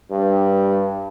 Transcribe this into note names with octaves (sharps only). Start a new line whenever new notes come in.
G2